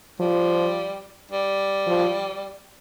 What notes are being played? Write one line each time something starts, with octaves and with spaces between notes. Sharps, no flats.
F3 G3
G3
F3